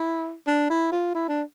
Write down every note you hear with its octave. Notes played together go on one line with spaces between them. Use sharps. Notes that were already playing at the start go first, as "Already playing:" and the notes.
Already playing: E4
D4
E4
F4
E4
D4